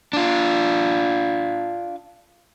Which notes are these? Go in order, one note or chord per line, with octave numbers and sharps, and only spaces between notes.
D4 F4